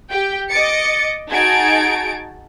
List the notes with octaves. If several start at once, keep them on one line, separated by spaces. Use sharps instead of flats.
G4 G5
D#5 D6 A6 C#7
D#4 F#4 G#4 A5 G#6 D7